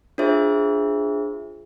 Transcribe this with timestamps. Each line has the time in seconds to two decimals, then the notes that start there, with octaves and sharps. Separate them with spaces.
0.18 D4 F4 G#4 C5 E5